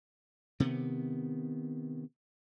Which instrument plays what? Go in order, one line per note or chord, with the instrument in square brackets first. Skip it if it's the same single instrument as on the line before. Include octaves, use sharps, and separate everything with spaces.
[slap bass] C3 D#3 B3